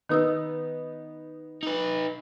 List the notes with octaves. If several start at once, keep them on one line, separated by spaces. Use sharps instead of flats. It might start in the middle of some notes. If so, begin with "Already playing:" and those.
D#3 B3 D#4 D#6 E6
D#4 B4